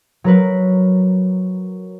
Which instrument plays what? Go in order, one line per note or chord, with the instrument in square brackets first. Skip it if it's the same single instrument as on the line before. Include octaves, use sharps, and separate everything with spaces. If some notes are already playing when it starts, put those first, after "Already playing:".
[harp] F#3 A#4 B4